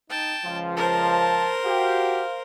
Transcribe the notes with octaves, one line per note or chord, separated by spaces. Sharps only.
D#4 G5 A5
C#2 F3 F4
A#4 C5 A5
F#4 G4 F5